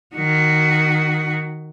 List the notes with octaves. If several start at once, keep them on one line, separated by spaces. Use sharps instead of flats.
D#3 F#4